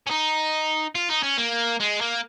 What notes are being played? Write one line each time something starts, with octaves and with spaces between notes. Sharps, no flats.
C#4
D#4
F4
D#4
C#4
A#3
G#3
A#3